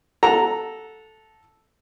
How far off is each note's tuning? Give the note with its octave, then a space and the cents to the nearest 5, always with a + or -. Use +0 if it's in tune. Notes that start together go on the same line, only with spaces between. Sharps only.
A4 -5 F#5 -20 A#5 +0